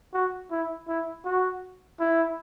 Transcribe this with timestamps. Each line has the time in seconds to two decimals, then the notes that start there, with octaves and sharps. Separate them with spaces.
0.14 F#4
0.51 E4
0.88 E4
1.25 F#4
2.00 E4